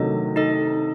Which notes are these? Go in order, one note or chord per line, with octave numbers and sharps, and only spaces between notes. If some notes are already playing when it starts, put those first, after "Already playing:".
Already playing: C3 D#3 F#3 A3 D#4 A4 D#5
D#4 A4 D#5